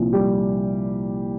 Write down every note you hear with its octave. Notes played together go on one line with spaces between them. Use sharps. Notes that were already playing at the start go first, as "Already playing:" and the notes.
Already playing: C2 A#2 F3
G3 G4